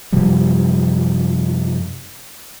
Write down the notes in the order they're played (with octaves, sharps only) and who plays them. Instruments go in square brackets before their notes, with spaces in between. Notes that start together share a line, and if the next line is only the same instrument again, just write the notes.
[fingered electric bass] F#2 C3 F3 G3